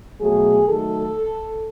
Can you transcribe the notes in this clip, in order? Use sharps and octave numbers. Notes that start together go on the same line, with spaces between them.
B2 F#3 A3 G#4
D#3 F#3 A3 A4